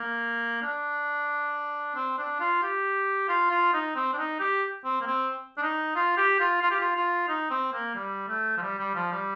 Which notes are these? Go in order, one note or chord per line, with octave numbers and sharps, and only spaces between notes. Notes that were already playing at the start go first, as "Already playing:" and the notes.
Already playing: A#3
D4
C4
D4
F4
G4
F4
F4
D#4
C4
D4
D#4
G4
C4
A#3
C4
D4
D#4
F4
G4
F4
F4
G4
F4
F4
D#4
C4
A#3
G3
A3
F3
G3
G3
F3
G3